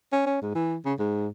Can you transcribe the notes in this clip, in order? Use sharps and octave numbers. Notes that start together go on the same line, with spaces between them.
C#4
C#4
G#2
E3
C#3
G#2